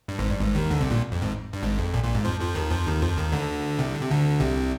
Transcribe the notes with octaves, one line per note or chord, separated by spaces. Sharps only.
G2
G#1 G#2
G2
G#1 G#2
D#2 D#3
D2 D3
C2 C3
A#1 A#2
F2
G#1 G#2
G2
G#1 G#2
F2
A#1 A#2
A#1 A#2
G#1 G#2
F2 F3
F2 F3
D#2 D#3
F2 F3
D#2 D#3
F2 F3
D#2 D#3
D2 D3
C2 C3
D3
C3
D2 D3
C2 C3